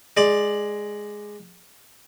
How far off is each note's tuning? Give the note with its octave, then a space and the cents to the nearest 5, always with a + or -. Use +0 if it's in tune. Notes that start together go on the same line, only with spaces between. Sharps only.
G#3 +0 D5 +15